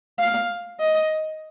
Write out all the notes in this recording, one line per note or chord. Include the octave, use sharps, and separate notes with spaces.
F5
D#5